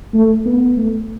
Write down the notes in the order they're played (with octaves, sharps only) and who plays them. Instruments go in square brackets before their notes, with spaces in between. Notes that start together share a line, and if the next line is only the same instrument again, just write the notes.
[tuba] A3
B3
A3